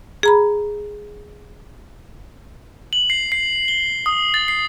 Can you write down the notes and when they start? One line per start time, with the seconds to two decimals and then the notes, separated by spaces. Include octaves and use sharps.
0.23 G#4 A#5 B5
2.93 F#7
3.10 C7
3.32 C7
3.68 G7
4.06 D#6
4.34 A6
4.48 C7